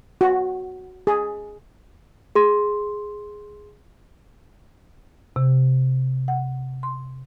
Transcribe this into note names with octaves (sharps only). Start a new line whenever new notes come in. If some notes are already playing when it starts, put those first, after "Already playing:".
F#4
G#4
G#4 C6
C3
F#5
C6